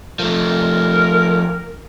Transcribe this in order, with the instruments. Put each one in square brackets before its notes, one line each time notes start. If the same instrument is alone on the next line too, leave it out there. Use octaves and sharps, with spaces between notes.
[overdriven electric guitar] F3 A3 [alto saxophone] A#4